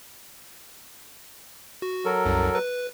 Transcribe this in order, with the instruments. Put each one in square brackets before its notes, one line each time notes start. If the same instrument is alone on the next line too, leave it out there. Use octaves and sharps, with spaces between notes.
[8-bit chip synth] F#4
[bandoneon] F#3 A4 A#4
[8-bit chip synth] C2 F#2
B4